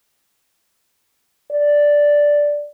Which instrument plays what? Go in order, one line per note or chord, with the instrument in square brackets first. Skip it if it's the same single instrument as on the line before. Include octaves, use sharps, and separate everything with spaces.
[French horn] D5